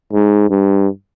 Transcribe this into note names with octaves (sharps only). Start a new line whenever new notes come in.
G#2
G2